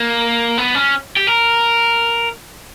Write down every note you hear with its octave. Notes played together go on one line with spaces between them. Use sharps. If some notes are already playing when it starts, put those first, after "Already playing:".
Already playing: A#3
B3
C#4
G4
A#4